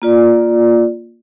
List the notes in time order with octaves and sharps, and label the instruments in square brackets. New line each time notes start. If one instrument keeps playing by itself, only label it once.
[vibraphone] A#3 F4 D5